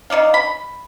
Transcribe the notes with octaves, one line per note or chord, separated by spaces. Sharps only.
D#4 E4 D5 F5
B5